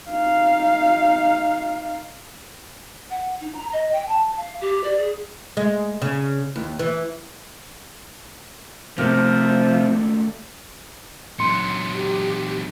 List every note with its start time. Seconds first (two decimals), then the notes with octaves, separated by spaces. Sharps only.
0.10 D#4 F5
3.10 F#5
3.40 D#4
3.54 A#5
3.72 D#5
3.92 G5
4.08 A5
4.37 F5
4.60 G4
4.83 D5
4.97 G#4
5.57 G#3
6.02 C#3
6.56 D#2
6.79 E3
8.98 D#2 C3 F3 A3 A#4
11.39 A#2 F#3 C6 C#7
11.94 G4